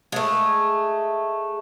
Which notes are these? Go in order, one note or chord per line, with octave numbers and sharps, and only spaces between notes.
G#3 A3